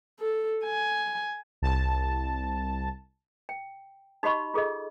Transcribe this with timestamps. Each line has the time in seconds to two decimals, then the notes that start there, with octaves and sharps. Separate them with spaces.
0.20 A4
0.65 G#5
1.62 C2 A5
3.49 G5
4.23 D#4 F#4 G4 D#5 B5 C#6
4.54 F4 G#4 A4 D#5